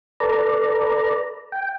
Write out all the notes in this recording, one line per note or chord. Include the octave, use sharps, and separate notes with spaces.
A4 B4 D5 A#5
G5